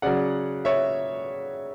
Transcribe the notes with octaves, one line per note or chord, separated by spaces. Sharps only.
C#3 F#3 D5 F#5
C#5 E5